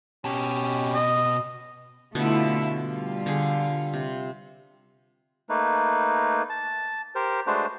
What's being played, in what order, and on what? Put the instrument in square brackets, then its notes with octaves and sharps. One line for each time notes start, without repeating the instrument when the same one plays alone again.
[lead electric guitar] B2 A5 [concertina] C#4 G4
[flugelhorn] D#5
[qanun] B2 D3 B3 [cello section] A3 E4 F4
[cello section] G3 F4
[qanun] D3 G4 G#4
C3
[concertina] A3 A#3 D#4 B4
A5
G4 A#4 C5
G#3 A3 D4 F#4 B4 C5